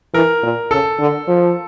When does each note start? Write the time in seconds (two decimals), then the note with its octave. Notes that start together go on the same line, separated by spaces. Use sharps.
0.14 E3 A#4
0.43 A#2
0.71 C#3 A4
1.00 D3
1.28 F3